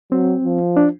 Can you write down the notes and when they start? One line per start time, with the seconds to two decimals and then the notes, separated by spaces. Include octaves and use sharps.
0.12 F#3 C4
0.44 F3
0.77 D4